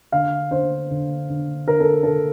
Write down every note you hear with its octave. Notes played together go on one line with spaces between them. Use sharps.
D3 F5
D3 C5
D3
D3
D3 A#4
A4
D3 A4